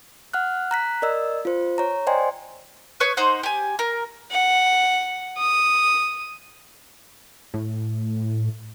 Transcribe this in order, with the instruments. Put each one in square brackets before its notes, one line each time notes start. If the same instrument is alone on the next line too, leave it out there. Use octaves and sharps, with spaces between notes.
[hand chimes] F#5 F6 F#6
A#5 F#6 B6
A#4 D5 D#5 E6
F4 C5
C#5 A#5
C5 D5 D#5 G5 G#5 C6
[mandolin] B4 C#5 C#6 D#6
D#4 C5 F#5
G4 G#5
A#4
[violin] F#5
D#6
[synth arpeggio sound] A2